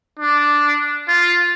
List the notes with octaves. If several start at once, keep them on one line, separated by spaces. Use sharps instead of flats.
D4
F4